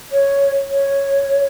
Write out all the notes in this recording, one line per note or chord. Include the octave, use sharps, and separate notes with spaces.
C#5
C#5